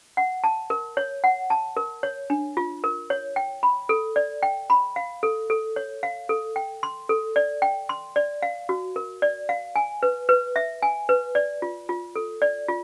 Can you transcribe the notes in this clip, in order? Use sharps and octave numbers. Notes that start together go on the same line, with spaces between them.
F#5
A5
A#4
C#5
F#5
A5
A#4
C#5
D4
F4
A#4
C#5
G5
B5
A4
D5
G5
B5
F5
A4
A4
C#5
F5
A4
G5
C6
A4
D5
G5
C6
D5
F5
F#4
A#4
D5
F5
G#5
B4
B4
E5
G#5
B4
D5
F4
F4
A4
D5
F4